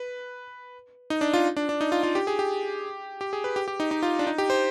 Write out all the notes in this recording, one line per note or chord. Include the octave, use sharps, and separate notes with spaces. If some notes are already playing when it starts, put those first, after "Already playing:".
Already playing: B4
D#4
D4
F4
D4
D4
D#4
F4
F4
G4
G#4
G4
G4
G#4
B4
G4
G4
D#4
D#4
F4
D4
D#4
G4
C5